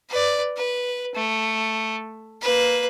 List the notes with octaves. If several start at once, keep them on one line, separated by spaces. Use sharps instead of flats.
B4 D5
B4
A3
A#3 B4